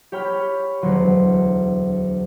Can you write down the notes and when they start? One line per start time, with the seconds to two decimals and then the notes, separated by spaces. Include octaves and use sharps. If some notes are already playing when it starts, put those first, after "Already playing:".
0.12 G4 C#5 G5 B5 F6
0.82 E1 D2 F#3 C6